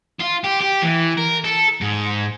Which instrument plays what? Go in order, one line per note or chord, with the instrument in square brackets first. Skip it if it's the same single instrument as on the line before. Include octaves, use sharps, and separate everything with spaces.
[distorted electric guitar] F4
G4
G4
E3
A#4
A4
G#2